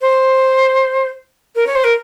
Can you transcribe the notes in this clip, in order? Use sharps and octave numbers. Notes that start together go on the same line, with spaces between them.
C5
A#4
C#5
C5
A#4